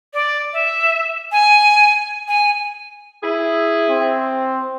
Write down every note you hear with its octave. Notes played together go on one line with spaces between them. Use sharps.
D5
E5
G#5
G#5
E4 G#4
C4